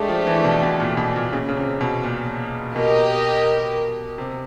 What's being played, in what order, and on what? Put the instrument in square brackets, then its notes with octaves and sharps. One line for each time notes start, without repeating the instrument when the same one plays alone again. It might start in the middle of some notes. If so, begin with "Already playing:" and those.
Already playing: [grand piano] G#3 [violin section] A3 D4 G4
[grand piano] F3
E3
B2
B2
A#2
B2
A#2
C#3
C#3
C3
B2
A#2
[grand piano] B2 [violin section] G4 A#4 D#5
[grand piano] C3